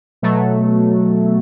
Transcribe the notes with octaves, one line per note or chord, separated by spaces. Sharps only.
B2 F#3 A3